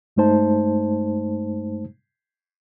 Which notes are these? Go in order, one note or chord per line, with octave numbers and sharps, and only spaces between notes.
G2 G#3 A3 D#4 C5 A5